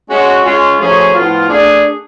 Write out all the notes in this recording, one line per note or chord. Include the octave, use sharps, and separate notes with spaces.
G#3 C#4 F#4
G#3 C#4 F4
F#2 F3 A3 C#4 G#4
A2 F3 B3 F4
A3 D4 G#4